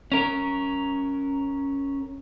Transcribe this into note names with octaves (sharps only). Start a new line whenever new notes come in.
C#4 A#4